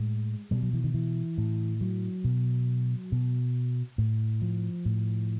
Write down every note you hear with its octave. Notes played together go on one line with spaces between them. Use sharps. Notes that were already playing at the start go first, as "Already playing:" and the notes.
Already playing: A2 G#3
B2 G3
F#3
E3
D#3
E3
A2
F#3
B2
B2
A2
F3
A2